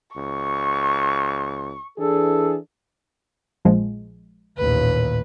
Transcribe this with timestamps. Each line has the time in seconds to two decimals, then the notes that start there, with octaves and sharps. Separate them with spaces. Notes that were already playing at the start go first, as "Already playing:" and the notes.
0.16 C#2 C#6
1.98 E3 D4 G#4 A4
3.65 A#1 F3 G#3
4.57 A1 D#2 A#2 B4